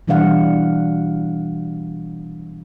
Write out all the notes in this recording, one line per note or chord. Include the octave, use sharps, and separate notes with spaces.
B2 E3 G3 D4 F5 F#5